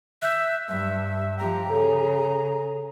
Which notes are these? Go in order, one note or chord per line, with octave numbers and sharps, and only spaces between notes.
E5 F#6 G6
G2 E5
F3 G4 A#5
C#3 G#4 A4 C#5